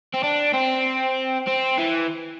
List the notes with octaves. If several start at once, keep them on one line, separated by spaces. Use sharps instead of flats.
C4
D4
C4
C4
E3